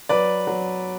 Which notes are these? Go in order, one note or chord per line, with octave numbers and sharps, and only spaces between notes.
F#3 B4 D5
F#3